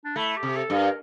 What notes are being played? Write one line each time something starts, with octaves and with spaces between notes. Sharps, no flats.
D4
A3 E4
G4
C3
A4
G2
A#4